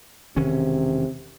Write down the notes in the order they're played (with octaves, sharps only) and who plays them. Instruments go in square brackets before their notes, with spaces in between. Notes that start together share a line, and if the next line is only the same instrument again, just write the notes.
[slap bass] E1 D#3 C#4 [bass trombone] C3